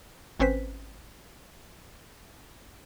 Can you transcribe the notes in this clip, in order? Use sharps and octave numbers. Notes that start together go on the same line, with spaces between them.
G#1 C4 C#4 B4 C5 B6